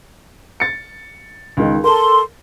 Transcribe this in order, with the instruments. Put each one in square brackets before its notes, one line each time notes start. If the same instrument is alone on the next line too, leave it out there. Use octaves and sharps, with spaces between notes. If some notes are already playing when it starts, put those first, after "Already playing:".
[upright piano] A6 C#7
C#2 D#3
[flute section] A4 C6 [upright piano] A#4